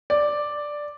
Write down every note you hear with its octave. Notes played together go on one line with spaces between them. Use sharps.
D5